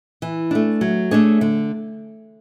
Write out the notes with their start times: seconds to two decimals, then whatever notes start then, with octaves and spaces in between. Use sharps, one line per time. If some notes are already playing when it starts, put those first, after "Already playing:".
0.22 E3
0.51 A3 D4
0.81 F#3
1.11 A3 D4 G#4 C#5
1.41 D3